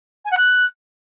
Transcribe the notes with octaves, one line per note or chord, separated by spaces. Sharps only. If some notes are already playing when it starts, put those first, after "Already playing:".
G#5
F#5
F#6